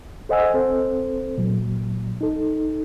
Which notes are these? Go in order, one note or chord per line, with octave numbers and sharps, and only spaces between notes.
A4 C5 D#5 F#5 G#5 E6
C4 A4 C5
A#2 F#3
D#4 A4